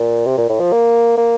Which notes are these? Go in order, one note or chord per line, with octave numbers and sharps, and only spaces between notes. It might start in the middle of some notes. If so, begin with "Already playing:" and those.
Already playing: A#2
C3
A#2
A2
F3
A#3
A#3